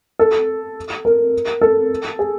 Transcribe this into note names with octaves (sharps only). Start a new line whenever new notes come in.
A4
A#4
A4
G#4